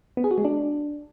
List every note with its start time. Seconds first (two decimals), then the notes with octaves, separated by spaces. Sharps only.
0.17 B3
0.24 G#4
0.31 F#4
0.38 G#3
0.45 D4